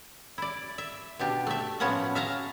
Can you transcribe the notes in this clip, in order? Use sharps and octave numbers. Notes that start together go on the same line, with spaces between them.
E4 D5
E5
B2 D4 G4
A3 E5
A2 F3 B3 C#4 F#4 F#5
E5 F5 A5 A#5